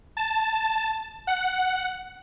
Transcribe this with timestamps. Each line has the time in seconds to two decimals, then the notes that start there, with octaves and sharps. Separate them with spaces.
0.17 A5
1.27 F#5